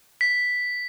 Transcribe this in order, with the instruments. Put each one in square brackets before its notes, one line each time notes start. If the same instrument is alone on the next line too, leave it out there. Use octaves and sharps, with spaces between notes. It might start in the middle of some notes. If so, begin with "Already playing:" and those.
[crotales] B6